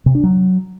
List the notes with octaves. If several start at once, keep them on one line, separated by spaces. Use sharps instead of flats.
C3
D4
F#3